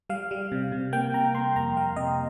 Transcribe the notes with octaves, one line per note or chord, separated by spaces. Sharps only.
G3 F5
G3
C3
C3
A#3 G5
C3 A#5
A#3 C6
F2 A#5
G3 F5
C3 D#5